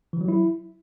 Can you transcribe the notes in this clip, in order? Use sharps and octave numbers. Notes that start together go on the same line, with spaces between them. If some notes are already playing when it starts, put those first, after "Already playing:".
E3
F#3
E4